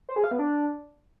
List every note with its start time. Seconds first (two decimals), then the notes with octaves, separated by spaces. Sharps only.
0.09 C5
0.16 G#4
0.24 F5
0.31 B3
0.39 D4